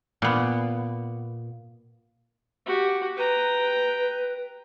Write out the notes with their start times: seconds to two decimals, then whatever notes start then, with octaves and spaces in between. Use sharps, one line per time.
0.22 A#2 B3
2.66 F#4 G4
3.17 B4 G5 A#5